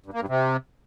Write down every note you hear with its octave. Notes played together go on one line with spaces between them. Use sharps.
G2
A#3
G2
C3